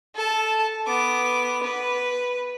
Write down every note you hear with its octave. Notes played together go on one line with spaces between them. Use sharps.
A4 A5
B3 D6
B4